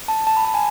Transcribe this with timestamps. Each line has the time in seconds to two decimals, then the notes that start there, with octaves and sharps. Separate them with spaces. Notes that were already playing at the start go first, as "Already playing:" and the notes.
0.08 A5
0.27 A5
0.37 B5
0.45 A5
0.54 G#5